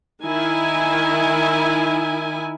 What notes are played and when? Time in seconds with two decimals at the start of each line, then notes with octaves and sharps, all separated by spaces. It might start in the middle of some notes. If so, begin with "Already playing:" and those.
0.24 D#3 E4 G#5